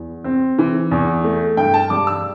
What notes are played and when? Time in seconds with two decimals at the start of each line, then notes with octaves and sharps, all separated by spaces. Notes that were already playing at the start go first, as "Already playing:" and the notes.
Already playing: E2
0.24 C4
0.58 E3
0.91 E2
1.24 A3
1.57 G2 G5
1.74 A5
1.90 G3 D6
2.07 E6